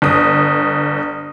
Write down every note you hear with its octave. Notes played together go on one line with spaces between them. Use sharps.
G1 D#6